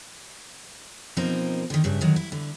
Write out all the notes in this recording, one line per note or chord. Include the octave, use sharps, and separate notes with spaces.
B2 F3 A#3 C4 D#4 A#4
D3 D#3
G2 C#3 E5
D3 D#3 F#3
E4
D3